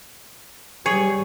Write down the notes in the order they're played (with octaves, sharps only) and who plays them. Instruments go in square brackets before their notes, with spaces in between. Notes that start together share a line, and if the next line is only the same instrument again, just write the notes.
[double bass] G3 [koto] G#4 C#5